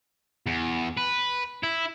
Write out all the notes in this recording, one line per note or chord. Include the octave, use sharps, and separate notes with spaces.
E2
B4
E4